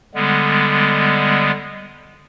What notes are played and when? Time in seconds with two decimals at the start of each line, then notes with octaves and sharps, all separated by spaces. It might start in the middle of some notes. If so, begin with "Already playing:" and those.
0.15 D3 G3 G#3 B3